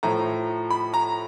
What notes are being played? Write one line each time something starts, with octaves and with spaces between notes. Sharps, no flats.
A2 F3 A#5
B5
A#5